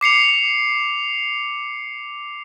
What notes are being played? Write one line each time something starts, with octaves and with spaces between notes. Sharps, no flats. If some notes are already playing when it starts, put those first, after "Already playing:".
D6 C7 C#7 F7